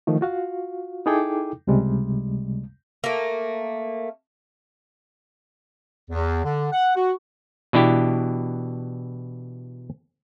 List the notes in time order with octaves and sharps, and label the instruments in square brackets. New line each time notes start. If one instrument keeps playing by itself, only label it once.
[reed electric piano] D#3 F3 A3
F4 F#4 F5
D#4 E4 G#4 A4 G5 D6
C#2 C3 G3 G#3
[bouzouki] A3 A#3
[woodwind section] E2
D3
F#5
F#4
[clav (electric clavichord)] B2 E3 D4 E4 G4